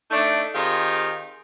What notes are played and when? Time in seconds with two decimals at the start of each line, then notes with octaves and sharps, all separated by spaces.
0.11 A3 D4 D#4
0.55 D#3 C4 D#4 F4 G4 G#4